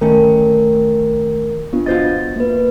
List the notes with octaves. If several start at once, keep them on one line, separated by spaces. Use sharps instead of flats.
D#3 A3 C#4 A#4
B3 D4 F4
F4 F#4 C5 D#5 A6
A#3 B4